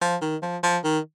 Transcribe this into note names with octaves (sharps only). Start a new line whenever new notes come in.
F3
D#3
F3
F3
D#3